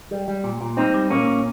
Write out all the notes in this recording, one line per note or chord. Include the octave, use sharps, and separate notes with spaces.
G3
G3
A#2
A#2
G3 C4 D#4
G3
A#2 A#3 C#4
A#2